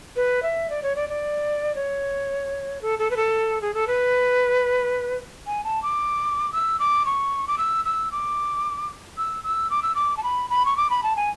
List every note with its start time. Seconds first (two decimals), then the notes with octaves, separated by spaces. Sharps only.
0.16 B4
0.43 E5
0.70 D5
0.83 C#5
0.96 D5
1.09 D5
1.75 C#5
2.82 A4
2.99 A4
3.11 B4
3.17 A4
3.61 G#4
3.74 A4
3.87 B4
5.47 G#5
5.64 A5
5.82 D6
6.52 E6
6.79 D6
7.06 C#6
7.48 D6
7.58 E6
7.85 E6
8.12 D6
9.17 E6
9.44 E6
9.70 D6
9.83 E6
9.95 D6
10.17 A5
10.23 B5
10.50 B5
10.66 C#6
10.77 D6
10.90 B5
11.03 A5
11.16 G#5